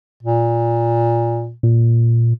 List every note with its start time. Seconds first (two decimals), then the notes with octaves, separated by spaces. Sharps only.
0.23 A#2
1.63 A#2